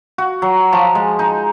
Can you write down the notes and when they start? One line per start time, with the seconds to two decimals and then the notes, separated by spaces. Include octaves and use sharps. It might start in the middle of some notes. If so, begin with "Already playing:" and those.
0.18 F#4
0.42 F#3
0.73 F3
0.95 G#3
1.19 D#4